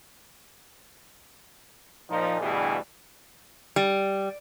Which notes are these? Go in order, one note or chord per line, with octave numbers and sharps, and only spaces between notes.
A#2 F3 D#4
D2 G2 B2 E3 G3 G#4
G3